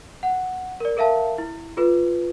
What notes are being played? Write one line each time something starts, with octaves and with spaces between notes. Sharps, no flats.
F#5
A#4 D5
A4 A#4 E5 F5 A5
E4
F4 A4 B4